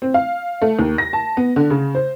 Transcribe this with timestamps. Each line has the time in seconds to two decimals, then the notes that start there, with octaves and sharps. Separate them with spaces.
0.02 C4
0.14 F5
0.62 A3
0.79 D#2
0.98 A#6
1.13 A5
1.37 B3
1.56 D3
1.70 C#3
1.95 C5